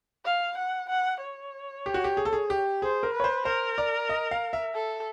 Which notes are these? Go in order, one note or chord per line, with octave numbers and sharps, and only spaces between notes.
F5
F#5
F#5
C#5
G4
F#4
G4
G#4
A4
G#4
G4
G#4 C5
A#4
B4
C#5
C5
A#4 C5
D5
D#5
F5
E5
A4